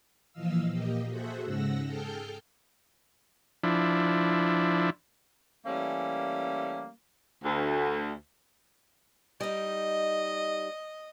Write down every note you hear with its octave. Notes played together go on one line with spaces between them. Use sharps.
A#2 E3 F3 D#5 F5 E6
A#2 A#3 G4 D#5
F#4 G#4 A4 C5 E5 F#5
G#2 C#3 F#5 E6 A#6
G#4 A4 G5 A5 F6 G6
F3 D4 E4
E3 G3 A3 A#3 C#4
D2
G3 D#4 D#5